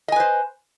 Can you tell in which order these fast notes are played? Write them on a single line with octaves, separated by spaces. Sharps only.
D#5 G#5 B4 C5